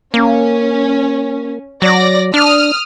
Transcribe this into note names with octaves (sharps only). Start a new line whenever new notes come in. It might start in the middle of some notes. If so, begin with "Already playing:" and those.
A#3 C#4
F#3 D5 A#6
D4 D#6 F6